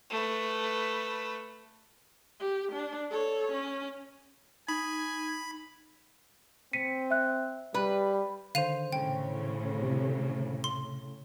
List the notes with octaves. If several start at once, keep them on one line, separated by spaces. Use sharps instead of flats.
A3 B4
G4
D4
A4 C#5
C#4
D#4 G#5 B5
C4 B6 C#7 D#7
E5 F#6
G3 B4
D3 D#3 C5 F5 D#7 F7
A2 C#3 G5
C2 C3
C6